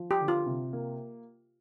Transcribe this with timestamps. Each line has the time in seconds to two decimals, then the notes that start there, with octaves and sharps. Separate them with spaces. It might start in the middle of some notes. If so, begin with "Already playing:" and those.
Already playing: F3
0.11 G4
0.20 D3
0.28 F4
0.46 C3
0.73 A#3